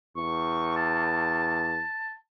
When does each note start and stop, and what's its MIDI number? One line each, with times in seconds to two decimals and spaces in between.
0.16 1.83 40
0.16 0.72 85
0.76 2.15 81